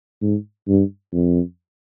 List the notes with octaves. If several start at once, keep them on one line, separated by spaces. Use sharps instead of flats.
G#2
G2
F2